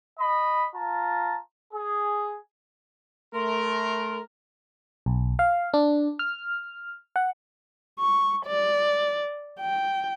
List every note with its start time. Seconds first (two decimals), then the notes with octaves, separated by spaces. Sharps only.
0.19 D#5 B5
0.74 F4 A5 A#5
1.74 G#4
3.34 A3 A#4 C6
5.06 B1
5.39 F5
5.74 D4
6.19 F6
7.16 F#5
7.99 C#6
8.46 D5
9.60 G5